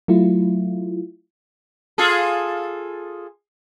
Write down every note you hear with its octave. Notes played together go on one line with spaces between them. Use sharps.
F#3 A3 E4 F4
F4 G#4 A4